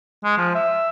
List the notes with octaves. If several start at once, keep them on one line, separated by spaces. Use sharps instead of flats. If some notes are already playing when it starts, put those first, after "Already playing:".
G#3
F3
E5